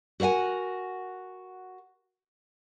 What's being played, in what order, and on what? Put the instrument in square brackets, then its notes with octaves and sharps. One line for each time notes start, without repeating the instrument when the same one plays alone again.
[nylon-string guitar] F#4 A#4 C#5 F#5 G#5